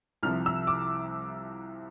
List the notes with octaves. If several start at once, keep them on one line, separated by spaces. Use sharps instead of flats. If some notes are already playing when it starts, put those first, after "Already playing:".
C2 C3 F3 F6
E6
D6